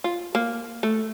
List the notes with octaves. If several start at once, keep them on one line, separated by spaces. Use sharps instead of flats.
F4
A#3
A3